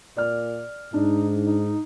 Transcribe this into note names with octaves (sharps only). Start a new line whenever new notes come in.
A#2 D5 F6
G#2 D4 D#4
D#4